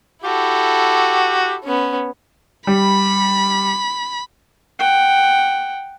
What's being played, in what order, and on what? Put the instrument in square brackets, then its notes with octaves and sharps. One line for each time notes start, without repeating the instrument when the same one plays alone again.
[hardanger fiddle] E4 A4 [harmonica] F#4 G4
[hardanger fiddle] B3 C#4
[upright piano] G3 [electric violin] B5
[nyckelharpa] F#5 G5